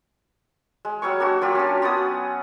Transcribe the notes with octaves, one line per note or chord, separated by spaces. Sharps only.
G#3
F#3 G3 C#5 C#6
A#3 D4 F#4
F#3 F4 G4
C#4 D4
B3 F#4 F#5 D#6